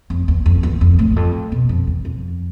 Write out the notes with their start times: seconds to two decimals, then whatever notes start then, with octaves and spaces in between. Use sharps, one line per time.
0.10 F2
0.28 E2
0.46 F2
0.63 E2
0.81 F2
0.99 A2
1.12 E2
1.16 F2
1.52 B2
1.69 F2
1.87 E2
2.05 F2